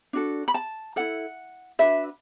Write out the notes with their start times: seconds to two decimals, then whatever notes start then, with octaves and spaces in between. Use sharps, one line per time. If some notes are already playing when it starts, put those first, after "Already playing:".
0.13 D4 F#4 A4
0.48 B5
0.54 A5
0.96 E4 A4 F#5
1.79 D4 F#4 B4 E5